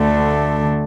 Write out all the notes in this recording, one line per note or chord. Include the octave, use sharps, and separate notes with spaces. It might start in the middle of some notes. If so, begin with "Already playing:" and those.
Already playing: D2 D3 A3 D4